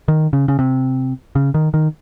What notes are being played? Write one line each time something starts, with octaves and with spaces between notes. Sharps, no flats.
D#3
C#3
C#3
C3
C#3
D#3
D#3